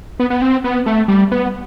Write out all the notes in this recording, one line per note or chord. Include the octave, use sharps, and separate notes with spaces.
B3
B3
C4
B3
A3
G3
B3